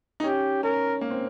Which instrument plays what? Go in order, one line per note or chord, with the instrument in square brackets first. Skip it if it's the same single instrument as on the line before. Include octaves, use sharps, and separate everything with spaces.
[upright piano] D#4
[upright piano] C#4 [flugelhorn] G4
[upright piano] C#4 [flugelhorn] A#4
[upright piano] A#3
C4